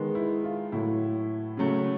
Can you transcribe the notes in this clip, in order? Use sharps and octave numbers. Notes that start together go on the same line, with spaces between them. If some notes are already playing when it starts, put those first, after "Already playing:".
Already playing: D#3 G#3 B3
E4
F4
A2 F#3 A3 E4
C#3 F#3 A3